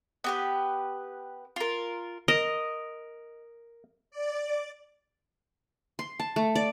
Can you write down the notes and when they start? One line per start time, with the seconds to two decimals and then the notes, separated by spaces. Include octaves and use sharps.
0.24 B3 G4 B4
1.56 F4 A#4
2.28 A#4 D#5
4.11 D5
5.99 C6
6.20 A5
6.36 A3
6.55 D5